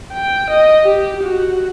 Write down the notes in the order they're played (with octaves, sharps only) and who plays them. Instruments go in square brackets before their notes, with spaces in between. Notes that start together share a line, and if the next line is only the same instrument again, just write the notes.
[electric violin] G5
D#5
G4
F#4